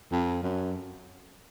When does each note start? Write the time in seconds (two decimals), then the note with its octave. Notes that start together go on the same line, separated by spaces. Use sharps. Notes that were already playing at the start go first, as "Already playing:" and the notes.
0.12 F2
0.43 F#2